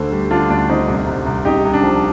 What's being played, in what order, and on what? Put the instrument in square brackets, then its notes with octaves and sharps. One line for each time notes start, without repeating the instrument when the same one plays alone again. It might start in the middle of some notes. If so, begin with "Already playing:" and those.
Already playing: [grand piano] D2 D3 A4 C5
G3
D3 D4 F4
D2 D4
D3 C4 D#4
C2
C2
C2
C2 D#4 G4
C2
D4
F3